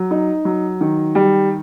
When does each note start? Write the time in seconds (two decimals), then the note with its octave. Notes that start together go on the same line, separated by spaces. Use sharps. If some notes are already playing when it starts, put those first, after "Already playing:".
Already playing: F#3
0.11 D#4
0.45 F#3
0.81 D#3
1.15 G3